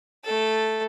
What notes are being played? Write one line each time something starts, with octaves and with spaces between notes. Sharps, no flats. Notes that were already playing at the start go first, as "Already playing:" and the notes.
A3 A4